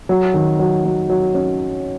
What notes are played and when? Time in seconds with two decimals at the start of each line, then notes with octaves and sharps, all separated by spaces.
0.09 F#3
0.34 D#3
0.59 F#3
0.85 F#3
1.10 F#3
1.35 C#4